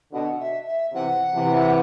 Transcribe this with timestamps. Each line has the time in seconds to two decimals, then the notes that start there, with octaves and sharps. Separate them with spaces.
0.12 B2 D3 F#5
0.39 E5
0.67 E5
0.93 C3 E3 F#5
1.34 C3 E3